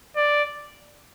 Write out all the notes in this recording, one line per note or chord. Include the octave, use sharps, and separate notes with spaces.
D5